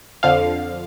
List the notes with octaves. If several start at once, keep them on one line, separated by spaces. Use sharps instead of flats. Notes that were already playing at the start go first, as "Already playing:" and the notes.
F2 D3 F3 F5